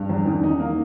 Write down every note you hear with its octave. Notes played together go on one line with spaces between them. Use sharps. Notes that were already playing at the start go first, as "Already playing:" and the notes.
Already playing: G2
E2
D#3
D#4
A#3